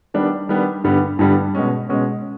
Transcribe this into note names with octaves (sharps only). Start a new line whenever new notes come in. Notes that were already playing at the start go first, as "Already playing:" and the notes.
D#3 G3 B3 D4
D#3 G3 B3 D4
G2 D3 G3 B3
G2 D3 G3 B3
B2 G#3 C#4
B2 G#3 C#4